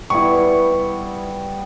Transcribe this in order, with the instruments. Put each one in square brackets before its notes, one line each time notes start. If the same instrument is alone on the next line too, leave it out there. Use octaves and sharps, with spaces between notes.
[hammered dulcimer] G3 B3 [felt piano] E4 C#6